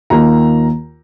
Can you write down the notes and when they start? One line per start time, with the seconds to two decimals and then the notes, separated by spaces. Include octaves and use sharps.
0.10 D#2 D#3 A#3 F4 A#5